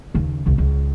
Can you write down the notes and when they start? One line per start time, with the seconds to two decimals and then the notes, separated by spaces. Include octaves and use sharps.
0.14 D#2 C#3
0.46 G#1 C#2
0.58 C#2